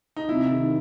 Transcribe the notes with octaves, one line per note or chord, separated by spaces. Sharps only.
D#4
C3 E4
D#3